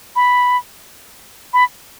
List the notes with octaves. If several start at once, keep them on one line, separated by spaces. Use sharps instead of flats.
B5
B5